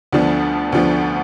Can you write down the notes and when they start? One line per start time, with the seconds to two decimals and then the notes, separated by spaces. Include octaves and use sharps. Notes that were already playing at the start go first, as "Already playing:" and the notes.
0.12 D2 D3 F3 B3 D4
0.72 D2 D3 F3 B3 D4